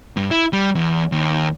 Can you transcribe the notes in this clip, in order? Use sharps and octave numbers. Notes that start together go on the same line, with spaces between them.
G2
E4
G3
E2
D#2